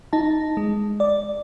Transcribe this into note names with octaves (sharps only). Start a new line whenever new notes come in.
D#4 A5
G#3
D5